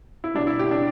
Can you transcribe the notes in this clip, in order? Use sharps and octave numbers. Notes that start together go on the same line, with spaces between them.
E4
B2 G3 D4
E4
G4
D4